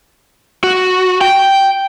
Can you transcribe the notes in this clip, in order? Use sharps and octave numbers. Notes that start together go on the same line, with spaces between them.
F#4
G5